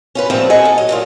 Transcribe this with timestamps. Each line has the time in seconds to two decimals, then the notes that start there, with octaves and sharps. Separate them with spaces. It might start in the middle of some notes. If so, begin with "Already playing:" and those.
0.15 C#4 F4 B4
0.30 A#2 F3 G3 A3 B3 C4
0.50 A4 D#5 F#5 G#5
0.65 A4
0.78 F#3 D#5
0.89 A#2 F#3 F4